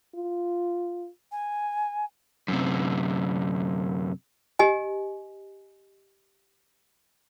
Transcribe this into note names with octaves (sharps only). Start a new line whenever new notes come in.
F4
G#5
F#2 C3
G4 D#5 G#5